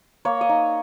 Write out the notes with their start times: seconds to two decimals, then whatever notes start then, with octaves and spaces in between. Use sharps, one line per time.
0.25 A#3 C#5
0.41 D#5
0.49 D#4